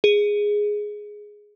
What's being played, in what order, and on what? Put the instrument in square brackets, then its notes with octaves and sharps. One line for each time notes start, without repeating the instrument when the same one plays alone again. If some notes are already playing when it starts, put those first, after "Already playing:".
[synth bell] G#4